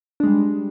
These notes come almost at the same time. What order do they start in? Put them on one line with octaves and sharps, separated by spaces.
D4 G#3 G3